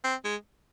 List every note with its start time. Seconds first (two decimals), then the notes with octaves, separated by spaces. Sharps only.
0.04 C4
0.25 G#3